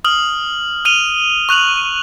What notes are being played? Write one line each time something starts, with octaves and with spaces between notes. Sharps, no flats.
D#6 F6 F#7
F6 D#7 F7 G7
C#6 F#6 F7 F#7